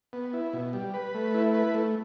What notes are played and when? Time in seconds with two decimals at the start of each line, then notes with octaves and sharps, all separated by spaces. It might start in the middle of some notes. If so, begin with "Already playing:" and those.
0.13 B3
0.33 E4
0.53 B2
0.73 G3
0.94 B4
1.14 A3
1.34 E4
1.54 B4
1.74 A3